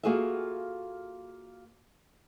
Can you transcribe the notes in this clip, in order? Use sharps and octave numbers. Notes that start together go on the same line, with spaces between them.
A#3 F4 F#4 G#4 A4 E5